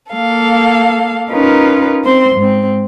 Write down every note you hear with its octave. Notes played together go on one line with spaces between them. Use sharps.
A#3 A4 F5
C#4 D#4 F4 A#4 B4
C4 C5 C6
G#2 C4